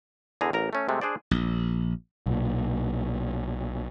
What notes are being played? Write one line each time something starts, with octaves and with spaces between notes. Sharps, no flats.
E2 D3 G#4 A#5
A1 A#4 A#5
A3 C#4
C3 G#3 A3
D4 G#4 C5 D5
A#1
B1 A#2